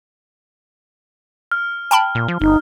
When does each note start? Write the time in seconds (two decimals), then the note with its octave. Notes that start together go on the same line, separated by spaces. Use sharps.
1.52 F6
1.91 G5 A5 B5
2.15 A#2
2.28 F3
2.41 G1 D#4